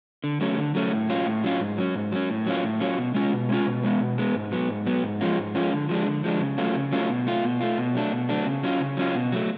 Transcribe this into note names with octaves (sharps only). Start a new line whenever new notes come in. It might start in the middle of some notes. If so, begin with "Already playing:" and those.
D3
F#3 A3 C#4
D3
F#3 A3 C#4
A2
F#3 C#4 F4
A2
F#3 C#4 F4
G#2
F#3 C#4
G#2
F#3 C#4
A2
F#3 C#4 F4
A2
F#3 C#4 F4
B2
G#3 C#4 F4
B2
G#3 C#4 F4
B2
G#3 B3
B2
G#3 B3
G#2
F#3 B3
G#2
F#3 B3
G#2
F3 G#3 C#4 F4
G#2
F3 G#3 C#4 F4
D3
F3 G#3 D4
D3
F3 G#3 D4
C#3
F#3 A3 C#4 F4
C#3
F#3 A3 C#4 F4
B2
A3 F4
B2
A3 F4
B2
F#3 A3 D4
B2
F#3 A3 D4
C#3
F#3 C#4 F4
C#3
F#3 C#4 F4
B2
F#3 A3